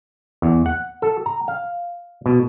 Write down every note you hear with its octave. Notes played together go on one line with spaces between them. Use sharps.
E2
F#5
A4
A#5
F5
B2